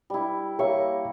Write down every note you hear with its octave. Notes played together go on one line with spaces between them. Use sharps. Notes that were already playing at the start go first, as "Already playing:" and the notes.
G3 E4
A#3 G4 C#5 E5 C#6